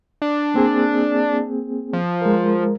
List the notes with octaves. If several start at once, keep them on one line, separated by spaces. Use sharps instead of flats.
D4
A#3 C4 G#4
F3
G#3 A#4